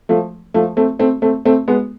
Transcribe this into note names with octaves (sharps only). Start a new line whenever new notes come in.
F3 A3
F3 A3
A3 C4
A3 C4
A3 C4
A3 C4
G#3 B3